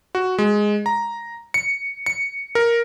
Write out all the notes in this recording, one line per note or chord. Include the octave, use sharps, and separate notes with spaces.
F#4
G#3
A#5
C#7
C#7
A#4